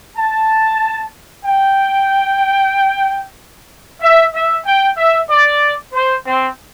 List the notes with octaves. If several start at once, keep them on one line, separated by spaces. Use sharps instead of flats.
A5
G5
E5
E5
G5
E5
D5
C5
C4